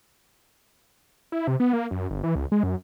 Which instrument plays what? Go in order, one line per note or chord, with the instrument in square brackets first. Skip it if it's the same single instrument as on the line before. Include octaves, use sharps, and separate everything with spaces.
[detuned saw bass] E4
C3
B3
A#3
F#2
G1
E3
C#2
G#3
F#2